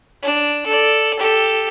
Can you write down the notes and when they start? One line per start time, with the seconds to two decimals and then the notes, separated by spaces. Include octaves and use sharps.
0.22 D4
0.66 A4 D5
1.19 G4 A4